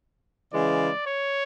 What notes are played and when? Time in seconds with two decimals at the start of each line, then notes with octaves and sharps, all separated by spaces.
0.53 C#3 E3 G#3 D5
1.07 C#5